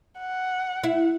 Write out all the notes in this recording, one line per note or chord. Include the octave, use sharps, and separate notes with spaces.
F#5
E4